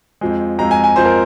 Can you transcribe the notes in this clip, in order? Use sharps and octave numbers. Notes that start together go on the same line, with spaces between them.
F2 F3 G#3
F2 F3 G#3 A#5
G#5
G#5
F2 F3 G#3 C5
A#4